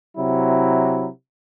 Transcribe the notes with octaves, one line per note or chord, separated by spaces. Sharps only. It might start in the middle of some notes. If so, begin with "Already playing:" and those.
C3 F#3 E4